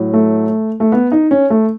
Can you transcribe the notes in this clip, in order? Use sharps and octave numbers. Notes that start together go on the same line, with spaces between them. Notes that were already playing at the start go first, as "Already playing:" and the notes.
Already playing: A2 F#3
A3
A3
B3
D#4
C#4
A3